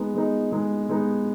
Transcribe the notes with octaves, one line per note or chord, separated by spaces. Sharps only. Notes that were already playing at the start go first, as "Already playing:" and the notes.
Already playing: G#3 B3 D#4
G#3 B3 D#4
G#3 B3 D#4
G#3 B3 D#4